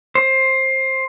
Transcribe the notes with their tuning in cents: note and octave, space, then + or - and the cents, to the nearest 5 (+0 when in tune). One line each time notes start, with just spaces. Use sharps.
C5 +15